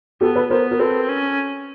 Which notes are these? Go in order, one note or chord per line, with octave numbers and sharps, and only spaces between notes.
B3 G4 A4
A4 B4
B3 A#4 C5
A#4
C4 A4 B4
C#4